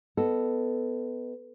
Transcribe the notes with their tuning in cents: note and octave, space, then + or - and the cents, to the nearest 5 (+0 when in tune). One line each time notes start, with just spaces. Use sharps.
B3 +10 A4 +0 D#5 -10